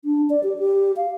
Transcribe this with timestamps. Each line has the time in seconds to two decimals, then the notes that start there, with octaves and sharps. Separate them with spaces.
0.05 D4
0.30 D5
0.43 G4
0.59 G4
0.97 F5